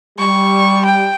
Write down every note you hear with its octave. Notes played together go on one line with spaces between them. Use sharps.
G3 C#6
G5